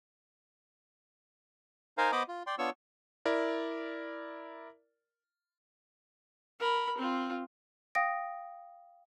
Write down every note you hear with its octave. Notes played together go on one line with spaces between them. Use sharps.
D#4 A#4 C5 F5 G#5 A#5
B3 C5 D#5 B5 D6 D#6
F4
D5 G5 C6
B3 D4 F4 C#5 C#6 E6
E4 A#4 D5
A#4 B5
C4 F4
F5 G5 D#6 A#6 D7